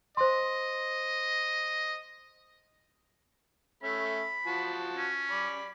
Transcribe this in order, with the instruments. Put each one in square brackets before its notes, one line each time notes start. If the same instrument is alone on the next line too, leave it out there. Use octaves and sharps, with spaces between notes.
[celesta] C5 C6 [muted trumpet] D#5
[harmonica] A3 C#4 E5 [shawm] B5
[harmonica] F3 F#4 A5
[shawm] C#4
[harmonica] D5 B5